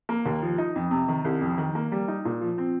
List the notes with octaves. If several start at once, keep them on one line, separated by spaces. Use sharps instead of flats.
A#3
D#2
F3
D#4
F2
C3
D#3
C2
F2
D#3
A#3
G3
D#4
A#2
F3
C4